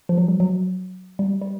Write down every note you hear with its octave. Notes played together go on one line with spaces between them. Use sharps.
F3
F#3
G3
F#3
G3
G3